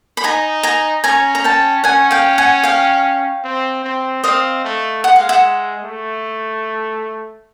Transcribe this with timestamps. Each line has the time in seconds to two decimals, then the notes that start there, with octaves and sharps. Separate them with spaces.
0.17 B5
0.24 D#4 G#5 A#5
0.63 G#5 A#5
1.04 C#4 G#5 A#5
1.35 A#5
1.44 G5 A5
1.84 C#4 F#5 G#5
2.11 F5 G5
2.38 F#5 G#5
2.63 F5 G5
3.44 C4
3.84 C4
4.24 C4 D#5 F5
4.64 A3
5.04 G#3 F#5
5.16 F5
5.29 E5 F#5
5.84 A3